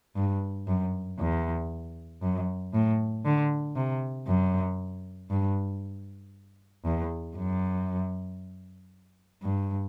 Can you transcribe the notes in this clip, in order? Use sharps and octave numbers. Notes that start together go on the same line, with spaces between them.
G2
F#2
E2
F#2
A2
D3
C3
F#2
G2
E2
F#2
G2